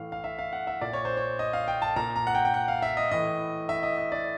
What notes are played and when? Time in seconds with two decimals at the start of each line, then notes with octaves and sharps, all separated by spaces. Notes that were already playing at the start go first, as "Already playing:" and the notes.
Already playing: A2 E3 F5
0.12 F5
0.24 E5
0.39 F5
0.53 F#5
0.67 E5
0.81 A#2 D5
0.93 C#5
1.05 C5
1.17 C#5
1.39 D#5
1.53 F5
1.68 G5
1.82 A5
1.96 A#2 A#5
2.16 A#5
2.27 F#5
2.35 G5
2.45 G5
2.54 F#5
2.68 F5
2.82 E5
2.97 D#5
3.11 A2 E3 D#5
3.69 E5
3.83 D#5
3.98 D#5
4.12 D5